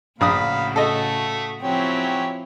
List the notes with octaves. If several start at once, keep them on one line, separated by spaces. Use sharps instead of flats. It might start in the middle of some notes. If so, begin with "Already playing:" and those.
A#1 A2 C#3 F#4 F5 B5 D#6
A3 A4 D#5
F3 F#3 C4 C#4 E4 G4